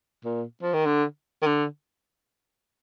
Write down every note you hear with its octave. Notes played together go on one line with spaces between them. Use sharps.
A#2
F3
D#3
D3
D#3
D3